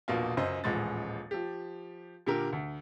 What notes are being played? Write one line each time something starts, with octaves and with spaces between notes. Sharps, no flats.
E1 A#1 B2 A#3 F4
C#2 F#2 C5 D#5
D#1 A1 F3 G#3 D#5 A6
F3 G4
A#2 D3 G4 A#4
D2